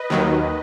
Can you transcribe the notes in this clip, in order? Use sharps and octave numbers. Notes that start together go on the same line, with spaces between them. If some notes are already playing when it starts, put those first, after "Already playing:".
Already playing: B4 D#5
D#2 D#3 F#3